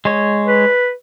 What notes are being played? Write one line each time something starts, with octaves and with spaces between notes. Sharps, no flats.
G#3 C#5
B4